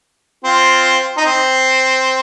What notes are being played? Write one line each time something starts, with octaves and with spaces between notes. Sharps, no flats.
C4 F4
D#4
C4